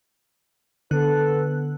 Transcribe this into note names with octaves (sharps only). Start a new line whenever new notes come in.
D3 B3 A4 F#6